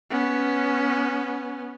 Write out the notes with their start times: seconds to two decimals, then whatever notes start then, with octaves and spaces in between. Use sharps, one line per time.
0.10 B3 C#4